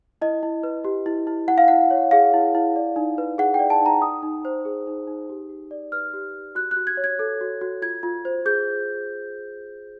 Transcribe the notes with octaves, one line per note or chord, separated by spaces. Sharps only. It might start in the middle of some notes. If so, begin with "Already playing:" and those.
E4 D#5
E4
B4
G4
E4
E4
E4 F#5
F5
E4 F#5
C#5
G#4 F5
E4
E4
D5
D#4
B4
G#4 F#5
D5 G5
A5
D#4 A#5
D#4 D#6
D#4
C5
G#4
D#4
D#4
G4
G4
D5
B4 F6
G4
G4
F#4 F#6
F#6
F#4
G#6
C#5
G#6
A4
F#4
F#4
F4 G#6
F4
C5
G#4 G6